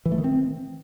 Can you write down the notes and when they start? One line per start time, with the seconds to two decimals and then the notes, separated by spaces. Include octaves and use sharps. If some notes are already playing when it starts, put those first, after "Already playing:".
0.05 E3
0.12 A3
0.18 D#3
0.24 C4